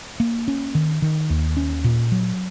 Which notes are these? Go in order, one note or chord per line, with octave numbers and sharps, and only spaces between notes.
A#3
C#4
D#3
D#3
D#2
C#4
A#2
F#3